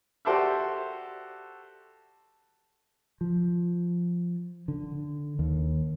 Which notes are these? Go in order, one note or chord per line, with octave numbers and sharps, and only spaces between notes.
F#4 G4 A4 C5 D5 E5
F3
D3
D#2